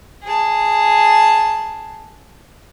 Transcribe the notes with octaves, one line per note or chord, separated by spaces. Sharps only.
G#4 A5